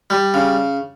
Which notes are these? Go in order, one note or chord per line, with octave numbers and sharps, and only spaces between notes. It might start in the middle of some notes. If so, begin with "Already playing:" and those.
G3
C#3